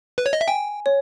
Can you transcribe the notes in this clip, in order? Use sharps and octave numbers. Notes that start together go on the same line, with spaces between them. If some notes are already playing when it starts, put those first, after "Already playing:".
B4
C#5
D#5
E5
G5 G#5
C#5